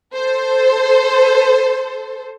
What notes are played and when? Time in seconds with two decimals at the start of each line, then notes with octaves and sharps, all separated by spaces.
0.15 A4 C5